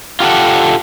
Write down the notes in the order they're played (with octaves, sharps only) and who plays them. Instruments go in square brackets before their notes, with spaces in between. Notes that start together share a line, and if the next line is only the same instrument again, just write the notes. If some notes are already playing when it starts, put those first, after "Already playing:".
[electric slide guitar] F4 G4 A4 F#5